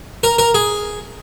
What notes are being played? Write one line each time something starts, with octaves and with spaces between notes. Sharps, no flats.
A#4
A#4
G#4